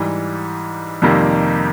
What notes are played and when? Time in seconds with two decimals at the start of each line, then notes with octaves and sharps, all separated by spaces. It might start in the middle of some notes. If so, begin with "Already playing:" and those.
Already playing: G#2 E3 G3
1.02 F2 C3 D#3 G3 A#3